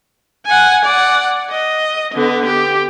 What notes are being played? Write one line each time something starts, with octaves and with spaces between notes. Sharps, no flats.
F#5 G#5
D5 F#5
D#5
D3 B3
G4